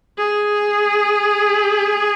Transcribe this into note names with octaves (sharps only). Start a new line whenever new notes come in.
G#4